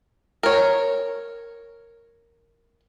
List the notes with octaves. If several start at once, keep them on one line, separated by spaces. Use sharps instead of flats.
A#4 C#5